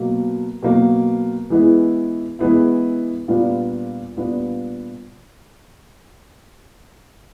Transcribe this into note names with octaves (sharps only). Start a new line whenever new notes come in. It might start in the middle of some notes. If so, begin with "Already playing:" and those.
Already playing: B2 F#3 A#3
B2 F#3 A#3
E3 G#3 B3 E4
E3 G#3 B3 E4
A#2 G3 B3 D4 F4
A#2 G3 B3 D4 F4